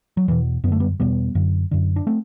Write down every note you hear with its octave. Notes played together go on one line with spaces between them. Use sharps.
F#3
E2 B2 E3
F#2 D3 A3 B3
G3 B3
E2 B2 G3 B3
F#2 D3
F#2 D3
D4
A3 C4